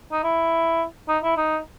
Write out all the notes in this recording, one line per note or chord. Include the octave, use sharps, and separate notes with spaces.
D#4
E4
D#4
E4
D#4